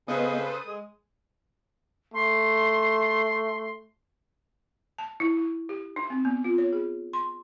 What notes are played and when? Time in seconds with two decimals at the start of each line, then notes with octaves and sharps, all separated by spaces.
0.08 C#3 B3 A4 B4 C5 D#5 D#6
0.46 D#6
0.67 G#3
2.14 A3 C6
4.98 A5
5.20 E4
5.37 E4
5.69 G4
5.96 D#4
6.10 C4
6.25 B3
6.44 F4
6.58 C#5
6.73 G#4
7.13 C6